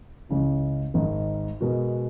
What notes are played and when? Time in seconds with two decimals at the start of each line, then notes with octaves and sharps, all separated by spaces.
0.29 C#2 C#3 E3
0.94 G#1 G#2 D#3
1.61 B2 G#3 B3 F#4 A#4